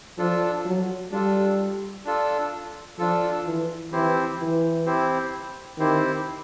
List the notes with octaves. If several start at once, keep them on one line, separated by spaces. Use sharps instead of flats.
F3 D4 F4 A4
F#3
G3 D4 F4 A4
D4 F4 A4
F3 D4 F4 A4
E3
E3 C4 E4 G4 C5
E3
C4 E4 G4 C5
D#3 C4 E4 G4 C5